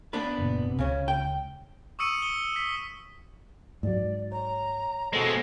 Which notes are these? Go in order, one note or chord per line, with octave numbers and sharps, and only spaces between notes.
B3 D4 B4
F#1 A#2
C3
C#2 C#3 C#4
G5
C#6 D#6 E6 C#7 D#7
G7
B6
G#2 F#3 D5
C#5 A#5
B2 G#3 A4 C5 F#5